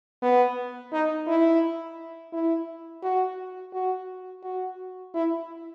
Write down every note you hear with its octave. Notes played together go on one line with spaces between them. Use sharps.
B3
D#4
E4
E4
F#4
F#4
F#4
E4